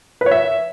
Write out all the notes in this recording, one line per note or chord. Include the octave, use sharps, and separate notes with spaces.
B4
C#5
E5